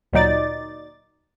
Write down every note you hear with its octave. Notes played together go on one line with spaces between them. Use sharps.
D2 A#2 F#3 D#4 D5 A6